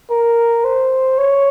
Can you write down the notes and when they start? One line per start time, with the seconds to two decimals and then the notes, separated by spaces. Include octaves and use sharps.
0.10 A#4
0.64 C5
1.18 C#5